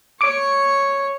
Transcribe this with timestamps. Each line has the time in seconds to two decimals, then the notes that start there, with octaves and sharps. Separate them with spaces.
0.21 C#5 C#6 D6 D7